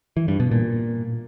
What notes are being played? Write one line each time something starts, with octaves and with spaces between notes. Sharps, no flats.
E3
G2
B2
A#2